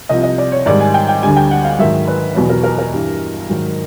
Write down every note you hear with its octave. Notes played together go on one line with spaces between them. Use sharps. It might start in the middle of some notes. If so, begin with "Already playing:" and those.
C2 C3 F3 D#5
D#5
D5
C#5
G#2 D#3 G3 D5
G#5
G5
G5
D2 D3 G3 G#5
G5
F#5
F5
G#2 D#3 F#3 E5
B4
E2 B2 F#3 B4
A#4
A#4
A#4
G2 E3 G3
G#2 D#3 F#3